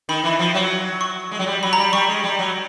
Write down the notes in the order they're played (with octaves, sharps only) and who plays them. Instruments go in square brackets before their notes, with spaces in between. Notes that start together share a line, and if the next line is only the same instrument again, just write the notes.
[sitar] D#3 [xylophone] B5
[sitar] E3
F3
F#3
[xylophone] C#6
[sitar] G#3
F#3
G3
[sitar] F#3 [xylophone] B5
[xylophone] A#5
[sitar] G3
[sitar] G3 [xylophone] C#6
[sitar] G#3
G3
F#3